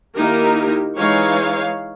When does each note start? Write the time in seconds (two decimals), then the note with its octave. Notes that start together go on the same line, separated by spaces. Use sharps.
0.15 D#3 A#3 D#4 E4 G4 A#4
0.96 E3 G#3 D#4 C#5 F5